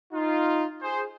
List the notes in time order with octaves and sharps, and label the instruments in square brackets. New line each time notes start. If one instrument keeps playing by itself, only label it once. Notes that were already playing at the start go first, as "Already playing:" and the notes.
[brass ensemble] D#4 F4
G#4 C5